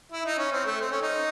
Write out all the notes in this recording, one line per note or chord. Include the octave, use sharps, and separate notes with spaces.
E4
D#4
C#4
C4
A3
C4
C#4
D#4